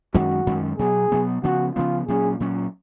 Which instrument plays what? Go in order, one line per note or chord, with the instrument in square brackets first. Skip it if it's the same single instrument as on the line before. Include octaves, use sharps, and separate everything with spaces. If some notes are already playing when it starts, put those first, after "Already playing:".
[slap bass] F#2 D#3 G#3 C#4 [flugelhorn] F#4
[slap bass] F#2 D#3 G#3 C#4
[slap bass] B2 F#3 B3 [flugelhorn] G#4
[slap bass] B2 F#3 B3
[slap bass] C#3 F3 B3 [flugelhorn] F#4
[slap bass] C#3 F3 B3 [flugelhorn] F4
[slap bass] A#2 F#3 C#4 [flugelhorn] G#4
[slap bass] A#2 F#3 C#4